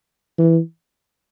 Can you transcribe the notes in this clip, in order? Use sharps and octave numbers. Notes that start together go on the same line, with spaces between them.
E3